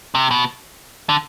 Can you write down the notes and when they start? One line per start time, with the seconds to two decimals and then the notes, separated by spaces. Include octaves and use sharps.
0.15 C3
0.31 B2
1.09 D3